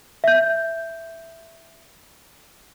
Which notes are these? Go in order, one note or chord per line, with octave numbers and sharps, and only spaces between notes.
E5 G6